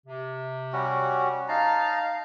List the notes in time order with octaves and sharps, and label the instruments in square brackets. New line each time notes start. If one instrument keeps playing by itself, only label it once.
[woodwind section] C3
[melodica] G3 C#4 F#4
[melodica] D#4 A5 A#5 [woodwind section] F5